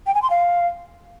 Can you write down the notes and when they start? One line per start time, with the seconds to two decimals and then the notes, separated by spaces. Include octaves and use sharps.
0.07 G5
0.14 G#5
0.22 C6
0.30 F5